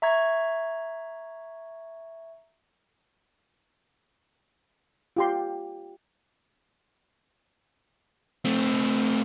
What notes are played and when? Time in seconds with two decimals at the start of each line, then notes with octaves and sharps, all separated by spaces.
0.02 E5 A#5 C#6 G#6
5.17 F4 G4 C6
8.45 A3 C4